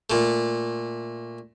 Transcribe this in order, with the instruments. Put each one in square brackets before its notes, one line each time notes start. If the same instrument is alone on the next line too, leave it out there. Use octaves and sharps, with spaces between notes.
[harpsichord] A#2 A3